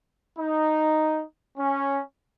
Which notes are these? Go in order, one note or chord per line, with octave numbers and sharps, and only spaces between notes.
D#4
C#4